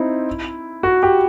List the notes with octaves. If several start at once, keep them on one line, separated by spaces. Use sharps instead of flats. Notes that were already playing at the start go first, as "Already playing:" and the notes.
Already playing: C4 D#4 E4
F#4
G4